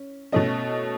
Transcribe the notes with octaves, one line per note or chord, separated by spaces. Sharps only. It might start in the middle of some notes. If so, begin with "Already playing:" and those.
Already playing: C#4
B2 A3 C#4 D#5